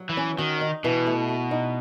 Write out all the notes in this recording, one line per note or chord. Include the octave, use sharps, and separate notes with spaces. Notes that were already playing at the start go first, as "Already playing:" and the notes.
Already playing: F#3
E3
C#4
D#3 F#4
D#4
B2 E3
A3
F#4
D#4